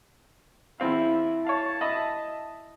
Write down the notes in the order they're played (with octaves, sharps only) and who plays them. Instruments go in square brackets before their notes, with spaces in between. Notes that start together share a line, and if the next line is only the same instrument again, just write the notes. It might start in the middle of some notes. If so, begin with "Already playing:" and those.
[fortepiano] E2 C4 F5 [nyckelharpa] E4
[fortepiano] C#5 F5 [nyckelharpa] A5
[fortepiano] D#5 E5 B5